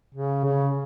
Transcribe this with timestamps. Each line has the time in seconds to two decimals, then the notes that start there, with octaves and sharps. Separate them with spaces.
0.14 C#3
0.44 C#3